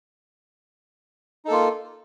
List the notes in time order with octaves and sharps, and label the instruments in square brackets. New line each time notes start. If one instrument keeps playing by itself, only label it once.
[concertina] D#4
A4
A#3
F4